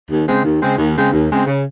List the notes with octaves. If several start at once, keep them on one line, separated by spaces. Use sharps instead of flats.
D#2
C#3 G#3 C4
D#2
C#3 G#3 C4
D#2
C#3 G#3 C4
D#2
C#3 G#3 C4
C#3